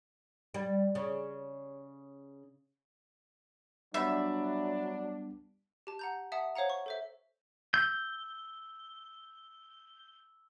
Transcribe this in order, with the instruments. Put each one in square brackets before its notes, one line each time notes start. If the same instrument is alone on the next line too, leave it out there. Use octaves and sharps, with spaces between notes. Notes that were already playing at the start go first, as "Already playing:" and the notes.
[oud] G3
C#3
[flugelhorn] F#3 [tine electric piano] G3 B3 [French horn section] D4 [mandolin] E5 B5
[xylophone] G4 A5
F#5 A#5 G6
E5 F#5 A5 D#6
C5 C#5 F5 F#5 A#5
C#6
A4 C5 E5
[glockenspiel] E6 G7 [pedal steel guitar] G6